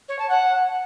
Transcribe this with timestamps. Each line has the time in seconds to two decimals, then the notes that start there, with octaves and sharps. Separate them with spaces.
0.09 C#5
0.19 A5
0.29 F#5